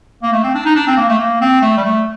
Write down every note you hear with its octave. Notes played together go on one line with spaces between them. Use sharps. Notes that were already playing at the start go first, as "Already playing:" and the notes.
A#3
A3
C4
D4
D#4
D4
C4
A#3
A3
A#3
C4
A3
G3
A3